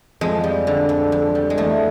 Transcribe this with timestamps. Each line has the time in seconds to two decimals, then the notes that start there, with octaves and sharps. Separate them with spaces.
0.21 F2 G#3
0.44 G3
0.67 D3
0.89 F2
1.12 F2
1.35 G3
1.50 G#3
1.57 E2 A3